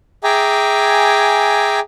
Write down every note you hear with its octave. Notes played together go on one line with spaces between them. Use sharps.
G#4 E5 G5 G#5 A#5 D6